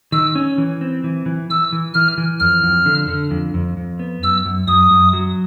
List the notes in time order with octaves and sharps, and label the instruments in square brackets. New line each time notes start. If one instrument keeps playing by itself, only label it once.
[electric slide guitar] D#3 [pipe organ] E6
[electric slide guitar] C#4
E3
C4
E3
E3
[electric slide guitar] E3 [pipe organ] E6
[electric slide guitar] E3
[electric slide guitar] E3 [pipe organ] F6
[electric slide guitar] E3
[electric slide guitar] F2 [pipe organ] F6
[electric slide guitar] F2
D3
D3
F2
F2
F2
B3
[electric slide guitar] F#2 [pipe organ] E6
[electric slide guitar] F#2
[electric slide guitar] F#2 [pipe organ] D#6
[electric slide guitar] F#2
F#3